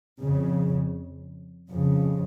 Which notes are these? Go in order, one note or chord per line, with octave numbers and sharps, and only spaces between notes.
F2 C#3
F2 C#3